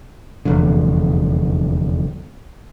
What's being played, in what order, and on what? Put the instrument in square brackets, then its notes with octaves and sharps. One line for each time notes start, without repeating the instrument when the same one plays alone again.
[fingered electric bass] F1 E2 G2 D3